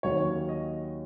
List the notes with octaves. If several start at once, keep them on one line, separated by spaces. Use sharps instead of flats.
D#2 D#3 F#3 C#4 C#5
D#5